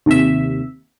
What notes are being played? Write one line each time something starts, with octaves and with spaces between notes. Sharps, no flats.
D#2 C3 E5